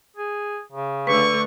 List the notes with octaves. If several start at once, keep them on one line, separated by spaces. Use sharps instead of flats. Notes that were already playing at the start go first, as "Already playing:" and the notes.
G#4
C#3
D3 A3 D4 B4 C#6